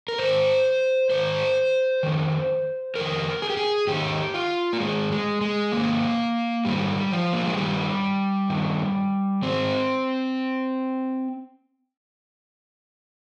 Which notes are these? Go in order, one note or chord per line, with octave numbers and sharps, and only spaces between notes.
A#4
G#2 D#3 C5
G#2 D#3 C5
F2 D#3
F2 D#3 A#4
G#4
G4
G#4
G#2 D#3 G4
F4
A#3
G#2 D#3 G#3
G#3
G#3
G#2 D#3 A#3
G#2 D#3 G3
F3
A#3
G#3
G2 D#3 G3
G2 D#3
G#2 D#3 C4